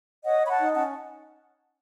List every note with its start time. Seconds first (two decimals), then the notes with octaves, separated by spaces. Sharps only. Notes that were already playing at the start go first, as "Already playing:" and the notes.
0.25 C#5 D#5 F#5
0.41 C#5 B5
0.50 F#5 A5
0.58 D#4
0.74 C#4 F#5 A5